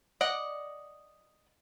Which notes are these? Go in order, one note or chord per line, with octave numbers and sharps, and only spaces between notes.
D5 D#5 F#5